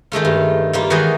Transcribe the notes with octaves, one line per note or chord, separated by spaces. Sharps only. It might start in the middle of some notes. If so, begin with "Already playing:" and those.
D#3 G#3 A3 F4
G2
G3 A#3 F4
D#3 E3 G#3 F#4 D#5 G#5